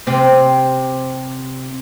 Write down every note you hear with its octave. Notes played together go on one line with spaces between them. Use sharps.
C3 C4